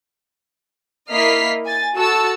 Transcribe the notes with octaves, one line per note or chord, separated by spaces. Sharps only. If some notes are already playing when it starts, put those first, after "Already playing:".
A#3 E4 D#5 F6 B6 C7
G#5 A6
F#4 A4 A5 E6